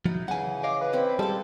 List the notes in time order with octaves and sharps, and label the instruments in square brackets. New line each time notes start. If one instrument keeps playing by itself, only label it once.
[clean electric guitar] F3 F#3 [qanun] D#4 E4
[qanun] C#3 E3 [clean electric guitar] F#5 G#5
[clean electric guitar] C#5 D#5 F5 [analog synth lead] D6
[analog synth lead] B4
[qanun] C4 C#4 E4
[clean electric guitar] G3 [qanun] G#3 D6 [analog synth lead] A4